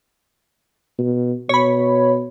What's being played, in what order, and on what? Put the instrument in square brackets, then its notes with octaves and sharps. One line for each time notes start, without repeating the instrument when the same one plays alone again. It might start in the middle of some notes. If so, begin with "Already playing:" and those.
[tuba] B2
[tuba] B2 [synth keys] C#5 B5